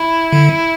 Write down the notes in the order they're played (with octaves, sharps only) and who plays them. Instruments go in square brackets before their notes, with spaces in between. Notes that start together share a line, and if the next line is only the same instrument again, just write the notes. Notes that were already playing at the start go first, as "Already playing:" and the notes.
Already playing: [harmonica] E4
[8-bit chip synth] D3